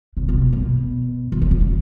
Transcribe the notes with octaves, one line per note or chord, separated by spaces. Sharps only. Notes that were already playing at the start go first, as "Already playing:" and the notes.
C3
B2
A#2
B2
E3
D#3
D3
D#3